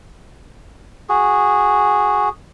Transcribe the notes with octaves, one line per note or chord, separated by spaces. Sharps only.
F#4 G#4